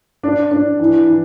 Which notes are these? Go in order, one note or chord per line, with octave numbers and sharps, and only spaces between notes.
D4
D4
E3
E3